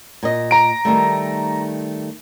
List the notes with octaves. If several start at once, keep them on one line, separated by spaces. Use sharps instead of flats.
A#2 D#5
A#5 D7
D#3 G3 A3